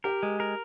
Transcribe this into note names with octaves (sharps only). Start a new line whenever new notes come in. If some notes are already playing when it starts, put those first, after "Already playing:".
G4 A#4
G#3
A#4